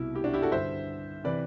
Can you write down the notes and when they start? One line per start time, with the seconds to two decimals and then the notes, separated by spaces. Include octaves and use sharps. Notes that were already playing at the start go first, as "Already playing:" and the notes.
Already playing: C2 B2 E4
0.15 E4 G4
0.24 D4 F#4
0.33 E4 G4
0.42 F#4 A4
0.51 G2 D3 C5 E5
1.24 C3 E3 B4 D5